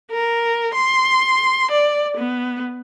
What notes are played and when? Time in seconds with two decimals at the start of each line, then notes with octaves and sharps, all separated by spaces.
0.11 A#4
0.74 C6
1.72 D5
2.17 B3